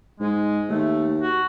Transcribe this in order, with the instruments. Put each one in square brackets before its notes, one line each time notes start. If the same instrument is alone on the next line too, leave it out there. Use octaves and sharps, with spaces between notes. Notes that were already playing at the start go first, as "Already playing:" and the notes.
[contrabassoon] G#2 [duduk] G#3
[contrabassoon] D#2 [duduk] A3
[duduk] F#4